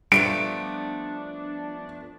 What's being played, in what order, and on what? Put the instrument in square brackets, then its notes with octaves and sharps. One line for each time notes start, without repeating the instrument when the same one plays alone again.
[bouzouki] F3 A3 B3 [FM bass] G3 [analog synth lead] D4 [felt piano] D7